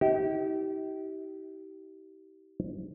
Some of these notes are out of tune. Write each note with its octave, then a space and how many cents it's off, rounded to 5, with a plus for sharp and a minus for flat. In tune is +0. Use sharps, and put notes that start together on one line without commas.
D#4 +45 G4 -30